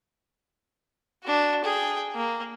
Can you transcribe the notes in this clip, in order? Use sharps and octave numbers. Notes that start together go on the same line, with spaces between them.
D4 F#4
G#4 G5
A#3